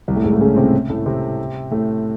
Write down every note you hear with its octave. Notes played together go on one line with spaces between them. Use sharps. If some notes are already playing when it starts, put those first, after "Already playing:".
C2 C3
A2 A3
G#2 G#3
A2 A3
C#3 C#4
C3 C4
A2 A3
C3 C4
A2 A3